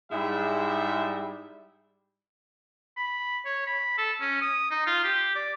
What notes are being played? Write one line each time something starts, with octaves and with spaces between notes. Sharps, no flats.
G#2 G3 G#3 E4 E5
B5
C#5
B5
A4
C#4
D#6
D#4
F4
G4
D5